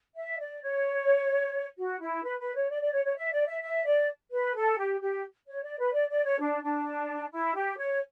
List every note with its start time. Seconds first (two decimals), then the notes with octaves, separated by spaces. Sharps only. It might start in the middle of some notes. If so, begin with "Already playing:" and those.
0.15 E5
0.39 D5
0.62 C#5
1.77 F#4
2.00 E4
2.24 B4
2.39 B4
2.54 C#5
2.69 D5
2.81 D5
2.93 C#5
3.05 C#5
3.16 E5
3.32 D5
3.47 E5
3.62 E5
3.85 D5
4.31 B4
4.55 A4
4.77 G4
5.00 G4
5.47 C#5
5.62 D5
5.78 B4
5.92 D5
6.09 D5
6.24 C#5
6.39 D4
6.63 D4
7.32 E4
7.55 G4
7.78 C#5